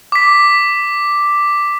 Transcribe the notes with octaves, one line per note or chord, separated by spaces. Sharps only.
D6 B6